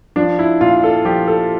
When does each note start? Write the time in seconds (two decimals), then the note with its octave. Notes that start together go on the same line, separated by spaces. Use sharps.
0.16 F3 D4
0.39 E4
0.61 A#2 F4
0.83 A4
1.05 F3 G4
1.28 A4